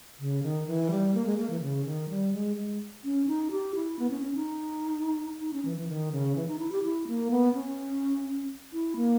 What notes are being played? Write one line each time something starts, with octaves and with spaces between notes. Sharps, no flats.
C#3
D#3
E3
G3
A#3
G#3
A#3
E3
C#3
D#3
G3
G#3
G#3
C#4
D#4
G4
E4
B3
C#4
C#4
D#4
D#4
C#4
E3
E3
D#3
C#3
E3
D#4
E4
G4
E4
A#3
B3
C#4
E4
A#3